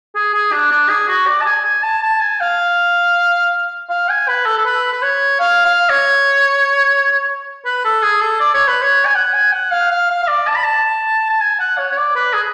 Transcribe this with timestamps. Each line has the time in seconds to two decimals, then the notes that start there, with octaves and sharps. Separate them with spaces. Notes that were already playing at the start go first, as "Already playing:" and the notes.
0.15 G#4
0.34 G#4
0.52 D4
0.71 D4
0.89 G#4
1.09 F#4
1.27 D5
1.41 A5
1.46 G#5
1.65 G#5
1.83 A5
2.03 A5
2.21 G#5
2.40 F5
3.90 F5
4.09 G#5
4.28 B4
4.46 A4
4.58 A4
4.65 B4
4.93 B4
5.02 C#5
5.40 F5
5.65 F5
5.90 C#5
7.65 B4
7.84 A4
8.02 G#4
8.21 A4
8.40 D5
8.54 C#5
8.68 B4
8.82 C#5
9.06 G#5
9.15 F#5
9.34 G#5
9.53 F#5
9.71 F5
9.91 F5
10.10 F5
10.23 F5
10.28 D5
10.47 A5
10.55 B5
10.64 A5
11.30 A5
11.41 G#5
11.60 F#5
11.78 C#5
11.92 C#5
11.97 D5
12.16 B4
12.33 G#4